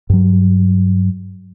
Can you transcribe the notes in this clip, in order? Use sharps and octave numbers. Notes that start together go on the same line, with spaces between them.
G2 F#3